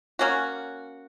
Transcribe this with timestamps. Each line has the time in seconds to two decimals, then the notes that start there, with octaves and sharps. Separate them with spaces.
0.19 A#3 C#4 F#4